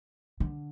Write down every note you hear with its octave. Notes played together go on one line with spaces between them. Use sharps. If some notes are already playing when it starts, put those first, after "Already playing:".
D3